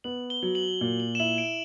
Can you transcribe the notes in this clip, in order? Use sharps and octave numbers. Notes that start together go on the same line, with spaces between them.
B3 F#7
G7
F#3
F#7
A#2
F#7
E7
E4 F#7
D7